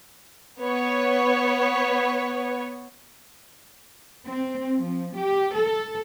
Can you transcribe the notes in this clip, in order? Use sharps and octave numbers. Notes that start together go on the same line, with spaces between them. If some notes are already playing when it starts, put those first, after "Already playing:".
B3 C#5
C4
F3
G4
A4